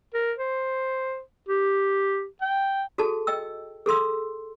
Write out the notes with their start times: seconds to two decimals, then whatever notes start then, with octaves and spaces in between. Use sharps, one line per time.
0.14 A#4
0.38 C5
1.48 G4
2.41 G5
2.98 F#4 G#4 A4 A5
3.27 D#5 G5 E6
3.86 G#4 A4 C6 E6